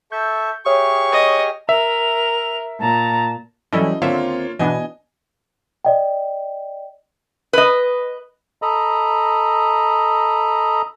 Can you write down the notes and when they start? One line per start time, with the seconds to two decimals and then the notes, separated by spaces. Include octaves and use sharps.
0.12 A4 E5 C#6 G6
0.66 G4 G#4 C#5 E5 C#6 D#6 F6
1.12 D#5
1.69 A#4 E5 F7
2.80 A#2 A5 A#5
3.73 E3 F#3 G3 C#4 E4 A4 D#5
4.02 D#2 D3 A#3 C4 F4 C#5 E5
4.59 B2 E3 B3 D4 D#5 G#5
5.85 D5 D#5 G5
7.53 B4 D#5
8.62 A4 D#5 A#5 B5